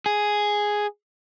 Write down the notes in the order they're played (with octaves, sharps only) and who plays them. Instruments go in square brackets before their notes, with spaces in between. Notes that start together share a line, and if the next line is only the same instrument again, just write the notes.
[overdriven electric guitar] G#4